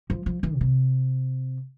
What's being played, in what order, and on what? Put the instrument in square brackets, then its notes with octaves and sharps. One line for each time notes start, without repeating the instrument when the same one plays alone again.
[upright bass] F3
F3
E3
A#2
C3